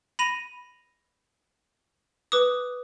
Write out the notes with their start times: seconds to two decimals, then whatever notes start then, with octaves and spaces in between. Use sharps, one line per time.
0.19 B5 A#6 D#7 F7
2.32 B4 D6 D#6